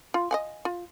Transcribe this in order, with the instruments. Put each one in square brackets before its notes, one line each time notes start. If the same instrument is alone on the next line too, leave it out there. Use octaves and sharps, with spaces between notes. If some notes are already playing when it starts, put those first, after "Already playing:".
[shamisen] F4
D#5 F#5 G#5
F4